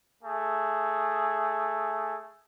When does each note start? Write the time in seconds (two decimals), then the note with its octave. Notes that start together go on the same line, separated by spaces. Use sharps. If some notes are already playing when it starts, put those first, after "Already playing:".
0.22 A3 G#4